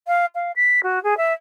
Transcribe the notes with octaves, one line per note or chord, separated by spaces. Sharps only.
F5
F5
B6
F#4
G#4
E5